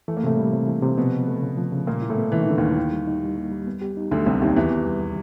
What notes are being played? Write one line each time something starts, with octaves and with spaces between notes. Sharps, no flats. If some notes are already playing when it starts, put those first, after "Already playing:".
E3 A3
A#3
A2 C3 A3
G3
C3
E3
C3
C4
B2 F3 B3
C#3
A3
C#3
F3
C#3
A#2 G3 A#3
E4
A2 A3
B3
B2 E3
D#3
D3 G3
D#2 D#3 E4
A#3
G3
D#4
G3
A#3
G3
B3
G4
D#4
D2 D3 F#3
C2 C3 B3
D#2 D#3 G4
E2 D#3 E3
B3
G3